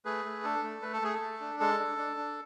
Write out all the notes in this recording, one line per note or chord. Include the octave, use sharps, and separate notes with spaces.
A3 G#4 B4
A3
D4 A4
A3
A3 B4
A4
A3 G#4
A4
A3
D4
G#3 A4
D4
D4
D4